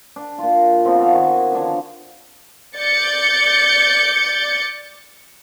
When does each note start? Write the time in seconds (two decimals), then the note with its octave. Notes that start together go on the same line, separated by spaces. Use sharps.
0.16 D4
0.38 A#2 F4
0.85 C#3 F3 B3 C4
0.99 F#4 A4 D5 F5
1.13 D#3 G#5
1.52 D3 F3 D4 C#5
2.77 D5 G6 A6 C#7